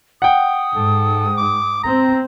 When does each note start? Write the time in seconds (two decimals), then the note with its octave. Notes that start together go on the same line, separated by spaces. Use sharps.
0.22 F#5 G5 D#6
0.76 G#2 A4
1.37 D6
1.83 C4 A#5